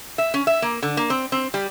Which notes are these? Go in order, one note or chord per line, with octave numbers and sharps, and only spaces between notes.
E5
C#4
E5
A#3
D3
A#3
C4
C4
G3